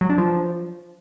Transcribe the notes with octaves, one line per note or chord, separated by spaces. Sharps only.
F#3
D4
F3